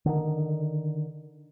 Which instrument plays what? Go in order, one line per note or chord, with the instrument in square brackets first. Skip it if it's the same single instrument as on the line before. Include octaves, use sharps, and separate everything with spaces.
[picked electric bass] D3 D#3